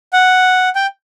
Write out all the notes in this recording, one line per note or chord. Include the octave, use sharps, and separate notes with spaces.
F#5
G5